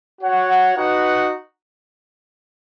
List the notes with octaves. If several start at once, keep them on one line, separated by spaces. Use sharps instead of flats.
F#4 C#5 F#5
D#4 F#4 B4 F#5